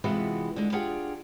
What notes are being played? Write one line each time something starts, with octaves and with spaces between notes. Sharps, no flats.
C3 E3 G#3 B3 F4 F#4
D3 G#3
D4 F4 G4 G#4 F#5 G#5